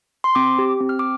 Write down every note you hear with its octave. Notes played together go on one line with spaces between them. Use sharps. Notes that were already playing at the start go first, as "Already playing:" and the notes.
C6
C4 D6
G4
C4
F6
D6